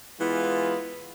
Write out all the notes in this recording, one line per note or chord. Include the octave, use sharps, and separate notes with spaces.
E3 G#3 B3 F4